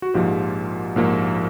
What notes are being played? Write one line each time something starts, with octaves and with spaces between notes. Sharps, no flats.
F#4
A#1 G#2 F3 A#3 F4 G4
A#1 G#2 F3 A#3